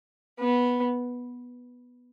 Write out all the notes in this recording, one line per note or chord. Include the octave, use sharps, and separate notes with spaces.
B3